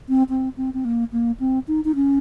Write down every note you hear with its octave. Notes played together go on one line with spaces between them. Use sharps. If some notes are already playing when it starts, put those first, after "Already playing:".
C4
C4
C4
C4
A#3
A#3
C4
D#4
D#4
C#4